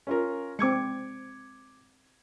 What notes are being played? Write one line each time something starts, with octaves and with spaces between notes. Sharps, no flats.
C#4 F4 A#4
G#3 C4 D6 G#6 C#7